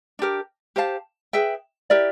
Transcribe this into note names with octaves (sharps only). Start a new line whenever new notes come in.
D4 G4 A#4
G4 C5 F5 A5
G#4 B4 E5 G5
E4 G4 A#4 D5